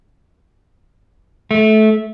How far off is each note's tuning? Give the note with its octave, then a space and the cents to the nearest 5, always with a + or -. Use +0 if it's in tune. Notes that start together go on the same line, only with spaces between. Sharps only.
A3 -20